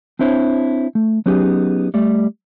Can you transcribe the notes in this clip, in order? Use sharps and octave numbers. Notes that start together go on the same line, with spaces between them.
C4 D4 E4 C5 C#5
A3
F#3 B3 C#4 D#4 G4 G#4
G3 A3 D5